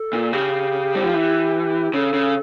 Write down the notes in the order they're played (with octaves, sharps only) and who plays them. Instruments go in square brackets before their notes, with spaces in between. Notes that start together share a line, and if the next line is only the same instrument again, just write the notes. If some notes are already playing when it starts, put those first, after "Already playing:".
Already playing: [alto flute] A4
[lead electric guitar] A#2
[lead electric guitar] C#3 [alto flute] G4
[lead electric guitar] G3
F3
E3
[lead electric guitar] C#3 [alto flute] A4
[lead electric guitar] C#3